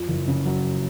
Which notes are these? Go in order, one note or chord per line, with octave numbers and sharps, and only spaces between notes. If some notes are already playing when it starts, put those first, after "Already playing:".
Already playing: F2
F#1
C#3
F#3